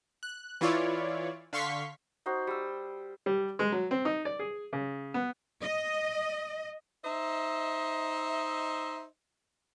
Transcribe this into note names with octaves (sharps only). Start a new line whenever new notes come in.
F#6
E3 E4 F4 C#5 D5
D3 F5 C6 C#6 B6
D#4 F#4 C5
G3 E6
G3
G#3
F#3
C4
D#4
D5
G#4
C#3
B3
D#5
D#4 C5 D#5 E5